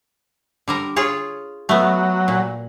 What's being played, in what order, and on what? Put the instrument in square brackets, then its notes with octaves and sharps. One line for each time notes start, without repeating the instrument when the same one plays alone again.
[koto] D3 G3 A#4
F4 G#4 C#5
[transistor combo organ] F#3 [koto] A3 B3
[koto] A#2